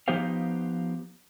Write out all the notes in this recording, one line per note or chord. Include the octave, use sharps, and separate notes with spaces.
F3 B3 D#4 G4 C5 F5